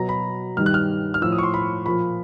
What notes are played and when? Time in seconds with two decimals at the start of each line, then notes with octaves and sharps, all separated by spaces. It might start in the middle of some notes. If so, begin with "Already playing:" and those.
Already playing: B2 F#3 A#5
0.09 B5
0.57 G2 D#3 G3 F6
0.66 F#6
0.74 F6
1.14 F6
1.22 A2 F3 E6
1.32 D#6
1.38 C#6
1.43 C6
1.54 B5
1.86 A#2 F3 B5